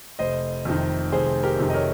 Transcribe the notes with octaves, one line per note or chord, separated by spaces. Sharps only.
F1 C5 D#5
F2 C3 D#3
F1 G#4 C5
G4 A#4
F2 C3 D#3
D#5
A#4 C#5